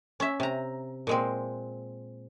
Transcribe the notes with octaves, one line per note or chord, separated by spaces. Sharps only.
C#4 E5
C3 A#5
A#2 G#3 C4